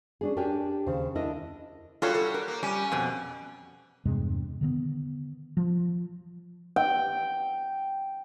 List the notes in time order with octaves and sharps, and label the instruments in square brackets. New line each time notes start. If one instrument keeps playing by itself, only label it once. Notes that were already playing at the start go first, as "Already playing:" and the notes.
[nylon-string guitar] C#4 D4 G#4
D4 G4 A#4 C#5 G5 G#5
D#2 C#3 C5
D4 E4 A#4 D#5
[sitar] G3 F#4 [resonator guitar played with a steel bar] F4 A4 C#5
[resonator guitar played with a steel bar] A4
A#4
[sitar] A#3
[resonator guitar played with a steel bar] G3 [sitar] C#4
[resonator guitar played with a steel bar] F2 B2
[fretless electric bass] E2 G2 C3 G#3
D3 D#3 B3
F3
[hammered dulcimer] G5